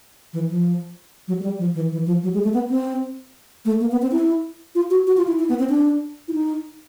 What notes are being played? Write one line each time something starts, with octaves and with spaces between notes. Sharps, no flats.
E3
F3
F#3
G#3
G3
F3
E3
E3
F3
F#3
G#3
A3
B3
C4
A3
A#3
B3
C4
E4
F4
F#4
F#4
F4
E4
E4
B3
C4
D4
E4
D#4